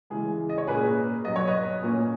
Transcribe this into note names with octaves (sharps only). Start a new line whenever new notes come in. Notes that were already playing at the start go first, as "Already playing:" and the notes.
C#3 E3 G#3 G#4
D#5
C#5
A#2 A#3 C#4 G#4 B4
B2 F#3 B3 D#5
C#5
B4 D#5
A#2 A#3 C#4